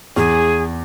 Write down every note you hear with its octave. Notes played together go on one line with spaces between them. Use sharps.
E2 G#4